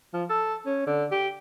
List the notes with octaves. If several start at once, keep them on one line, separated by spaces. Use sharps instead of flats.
F3
A4
C#4
D3
G4